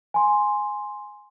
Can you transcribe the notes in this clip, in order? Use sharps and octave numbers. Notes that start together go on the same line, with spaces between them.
G#5 C6